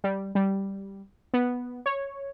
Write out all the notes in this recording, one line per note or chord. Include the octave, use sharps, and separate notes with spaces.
G3
G3
B3
C#5